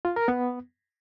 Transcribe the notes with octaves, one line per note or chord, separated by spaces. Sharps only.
F4
A#4
B3